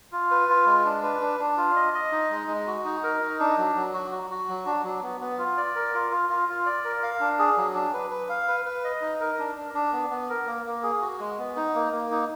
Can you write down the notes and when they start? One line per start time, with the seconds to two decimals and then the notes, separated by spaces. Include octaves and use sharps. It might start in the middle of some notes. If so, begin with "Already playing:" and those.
0.12 F4
0.31 B4
0.49 F4
0.66 G#3
0.85 D4
1.03 B4
1.21 D4
1.39 D4
1.57 F4
1.76 D#5
1.94 D#5
2.12 D#4
2.30 G#3
2.48 G#3
2.67 F#4
2.85 D#4
3.03 A#4
3.21 D#4
3.40 D4
3.58 F#3
3.76 F#3
3.94 F#4
4.11 F#4
4.30 F#4
4.48 F#3
4.66 D4
4.84 F#3
5.02 B3
5.21 B3
5.38 F4
5.57 D5
5.76 A#4
5.94 F4
6.11 F4
6.29 F4
6.48 F4
6.66 D5
6.84 A#4
7.03 F5
7.20 D4
7.39 G#4
7.57 F#3
7.74 D4
7.93 B4
8.11 B4
8.29 F5
8.48 B4
8.65 B4
8.84 D#5
9.01 D#4
9.20 A#4
9.39 D4
9.57 D4
9.74 D4
9.93 B3
10.10 B3
10.30 A#4
10.47 A#3
10.66 A#3
10.83 G#4
11.01 F#4
11.19 G#3
11.38 B3
11.56 D#4
11.75 A#3
11.92 A#3
12.11 D#4